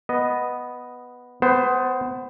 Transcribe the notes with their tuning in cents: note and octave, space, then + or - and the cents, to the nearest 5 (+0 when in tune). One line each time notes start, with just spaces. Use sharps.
B3 +0 D#5 +0
B3 +25 C5 +0